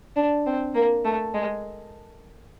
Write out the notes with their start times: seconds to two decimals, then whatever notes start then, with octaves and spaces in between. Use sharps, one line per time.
0.16 D4
0.46 C4
0.75 A#3
1.04 A3
1.34 G#3